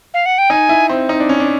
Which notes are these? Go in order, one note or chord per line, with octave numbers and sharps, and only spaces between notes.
F5
F#5
G5
D#4 G#5
E4
C4
D#4
D4
C#4
D4